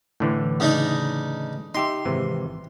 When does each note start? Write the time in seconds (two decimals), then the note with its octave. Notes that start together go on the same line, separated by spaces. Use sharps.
0.20 A2 D3 E3
0.60 C#3 D4 D#4
1.75 D#4 G4 E5 C6
2.05 G#1 C3 E3